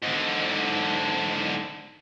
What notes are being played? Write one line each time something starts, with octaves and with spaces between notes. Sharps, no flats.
G#2 D3